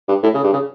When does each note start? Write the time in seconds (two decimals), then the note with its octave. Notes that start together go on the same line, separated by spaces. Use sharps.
0.09 G2
0.23 A2
0.34 C#3
0.44 G2
0.53 C#3